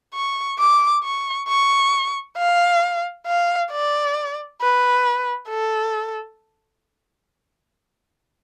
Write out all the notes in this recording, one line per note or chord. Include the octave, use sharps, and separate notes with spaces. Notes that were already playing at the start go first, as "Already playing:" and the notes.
C#6
D6
C#6
C#6
F5
F5
D5
B4
A4